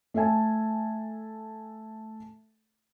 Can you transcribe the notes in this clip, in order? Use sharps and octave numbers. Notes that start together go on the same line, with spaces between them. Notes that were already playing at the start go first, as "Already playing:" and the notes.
A3 A4 E5 G#5 A5